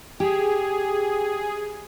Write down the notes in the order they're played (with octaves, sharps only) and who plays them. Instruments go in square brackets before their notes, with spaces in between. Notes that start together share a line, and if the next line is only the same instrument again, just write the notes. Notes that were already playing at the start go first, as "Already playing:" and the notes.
[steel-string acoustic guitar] G4 [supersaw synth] G#4